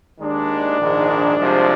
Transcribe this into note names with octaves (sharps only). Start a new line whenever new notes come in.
D#2 D#3 G#3 D4
A#1 G#2 D#3 G#3
C2 C3 F3 G#3